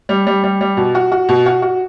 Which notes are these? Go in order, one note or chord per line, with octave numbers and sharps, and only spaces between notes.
G3
G3
G3
G3
B2
F#4
F#4
B2
F#4
F#4